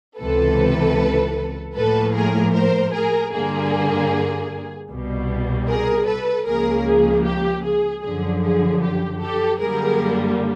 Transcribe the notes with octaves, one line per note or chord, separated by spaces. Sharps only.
C#2 C3 E3 A4 B4
A2 F3 A#3 A4 B4
G#4 A#4
A#4 C5
G#4 A#4
G2 D3 G3 A#3 G#4
C2 B2 G3
G#4 A#4
A4 B4
C#2 C#3 F3 A#3 G#4 A#4
G#4
G4
G#4
F#2 D3 F3 G#4
G#4
G4
G4 A4
F#2 D3 G3 A#3 G#4 A#4